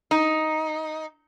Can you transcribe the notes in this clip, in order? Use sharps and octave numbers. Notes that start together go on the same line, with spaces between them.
D#4